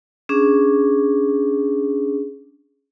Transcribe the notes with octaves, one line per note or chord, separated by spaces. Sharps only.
C#4 D4 G#4